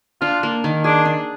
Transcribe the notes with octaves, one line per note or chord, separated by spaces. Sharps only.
D4 F4
A#3
D#3
D4 G#4
D4